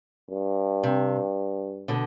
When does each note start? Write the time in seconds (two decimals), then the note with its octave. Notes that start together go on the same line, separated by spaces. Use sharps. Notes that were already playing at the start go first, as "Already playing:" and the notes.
0.30 G2
0.83 C3
1.88 B2 D3